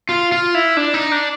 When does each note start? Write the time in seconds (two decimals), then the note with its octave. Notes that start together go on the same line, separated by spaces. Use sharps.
0.09 F4
0.32 F4
0.54 E4
0.77 D4
0.94 D#4
1.12 D4